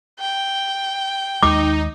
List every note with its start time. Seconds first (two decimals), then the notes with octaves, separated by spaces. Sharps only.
0.20 G5
1.43 D#2 G#3 D#4 D6